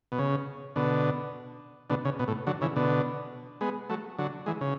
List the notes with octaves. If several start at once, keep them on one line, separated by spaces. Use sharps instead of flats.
B2
C#3
B2 D3
B2 D3
C#3
B2
A2
D3 F#3
C#3 E3
B2 D3
G#3 B3
F#3 A3
D3 F#3
E3 G#3
C#3